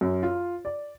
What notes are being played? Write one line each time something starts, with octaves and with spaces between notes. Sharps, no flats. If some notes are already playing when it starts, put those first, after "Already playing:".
F#2
F4
D5